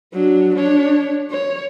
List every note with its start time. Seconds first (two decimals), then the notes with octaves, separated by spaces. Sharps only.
0.13 F#3 D4
0.56 D4 C#5
1.31 C#5